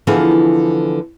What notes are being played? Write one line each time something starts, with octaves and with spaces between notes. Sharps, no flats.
D3 E3 F3 B3 F4 G#4